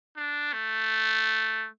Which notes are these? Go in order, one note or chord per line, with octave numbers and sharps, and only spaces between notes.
D4
A3